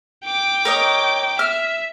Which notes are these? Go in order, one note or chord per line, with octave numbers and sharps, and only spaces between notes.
G5 D6
A#4 C#5 D#5
E5 F6